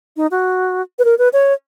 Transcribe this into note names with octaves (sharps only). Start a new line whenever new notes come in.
D#4
F#4
B4
A#4
B4
C#5